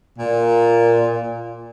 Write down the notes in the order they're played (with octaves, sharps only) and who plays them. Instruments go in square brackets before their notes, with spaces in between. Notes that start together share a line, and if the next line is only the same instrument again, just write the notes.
[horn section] A#2